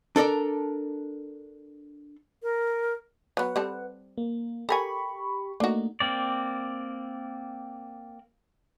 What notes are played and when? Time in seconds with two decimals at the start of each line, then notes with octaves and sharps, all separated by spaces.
0.16 D4 A4 A#4 D5
2.43 A#4
3.37 F#3 B3 B4 F#5
3.56 G3 C4 A4
4.18 A#3
4.69 G4 A4 A#4 G#5 B5 C#6
5.60 A3 A#3 D4 D#4 F#4
6.00 A#3 C4 D5